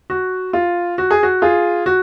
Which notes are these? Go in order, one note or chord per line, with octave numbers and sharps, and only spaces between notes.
F#4
F4
F#4
G#4
F#4
F4 G#4
F#4